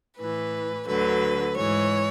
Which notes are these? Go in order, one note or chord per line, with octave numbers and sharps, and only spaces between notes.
A2 E3 B4
D2 D3 F#3 B4
G#2 E3 C#5